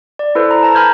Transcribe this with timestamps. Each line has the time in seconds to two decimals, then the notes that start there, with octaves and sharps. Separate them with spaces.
0.19 D5
0.35 E4 A4 B4 C5
0.51 A#5
0.63 A5 A#5 A#6
0.75 G#5 A#5 B5 F6 G6 G#6